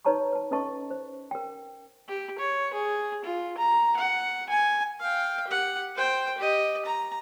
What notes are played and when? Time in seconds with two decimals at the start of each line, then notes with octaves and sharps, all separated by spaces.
0.05 D#4 B4 C#5 A5 A#5 C#6
0.33 B4 A5
0.51 C#4 A4 B4 D#5 A5 C#6
0.90 C5
1.31 A#4 G5
2.08 G4
2.39 C#5
2.73 G#4
3.24 F4
3.58 A#5
3.96 F#5
4.49 G#5
5.00 F5 G5
5.47 G4 F#5
5.96 C5 G5
6.38 G4 D#5
6.85 A#5